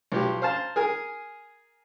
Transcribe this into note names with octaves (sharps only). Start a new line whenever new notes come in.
B1 F3 G4
C5 F5 A5 A#5
G#4 A#4 G#5